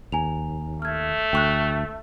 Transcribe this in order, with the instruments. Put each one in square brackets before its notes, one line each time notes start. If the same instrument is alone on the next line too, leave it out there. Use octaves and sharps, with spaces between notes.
[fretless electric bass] D#2 [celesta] G#5 A#5 F7
[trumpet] A3 [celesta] F6 G#6
[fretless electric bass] D2 [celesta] G5 C#6 F#6